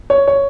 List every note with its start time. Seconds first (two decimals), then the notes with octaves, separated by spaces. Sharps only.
0.10 C#5
0.27 C#5